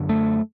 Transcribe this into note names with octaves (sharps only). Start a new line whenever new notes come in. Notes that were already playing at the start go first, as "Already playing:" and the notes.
Already playing: F#2 D3
A3